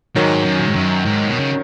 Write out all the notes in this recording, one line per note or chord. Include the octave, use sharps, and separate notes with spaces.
G#2 D#3 F#3
F#2
A#2
G#2
F#2
G#2
B2
C#3